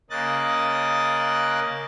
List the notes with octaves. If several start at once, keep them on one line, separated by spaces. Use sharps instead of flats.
C#3 A#3 D#5 F#6 A6